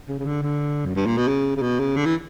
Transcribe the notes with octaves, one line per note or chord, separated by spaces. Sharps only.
C#3
C#3
D3
D3
F#2
G2
A#2
B2
C#3
C#3
B2
C#3
D3
E3